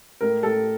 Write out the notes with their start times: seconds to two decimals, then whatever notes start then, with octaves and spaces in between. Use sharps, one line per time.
0.21 A2 A#4
0.43 A2 A4